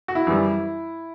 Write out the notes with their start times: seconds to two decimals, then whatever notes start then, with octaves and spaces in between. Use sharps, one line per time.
0.08 F#4
0.15 E4
0.27 F#2 E3 G3